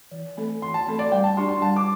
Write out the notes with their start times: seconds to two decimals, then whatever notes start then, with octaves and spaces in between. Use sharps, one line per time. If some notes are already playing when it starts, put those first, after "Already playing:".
0.11 E3
0.37 A3 C4 A4
0.62 E3 C6
0.74 A5
0.87 A3 C4 A4
0.99 D5
1.12 G3 G5
1.24 A5
1.37 D4 G4 D5 C6
1.49 C6
1.62 G3 A5
1.76 D6